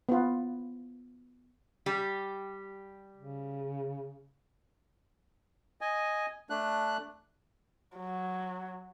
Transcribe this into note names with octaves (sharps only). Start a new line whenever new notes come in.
B3 F4
G3 G4
C#3
D#5 G#5
A3 D4 F#6
F#3